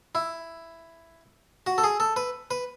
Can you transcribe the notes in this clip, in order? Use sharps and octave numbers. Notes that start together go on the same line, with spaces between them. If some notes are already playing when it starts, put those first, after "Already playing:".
E4
F#4
A4
G#4
A4
B4
B4